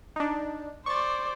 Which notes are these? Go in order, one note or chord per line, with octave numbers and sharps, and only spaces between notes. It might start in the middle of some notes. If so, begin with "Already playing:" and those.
D4 D#4
C5 D5 C#6 A6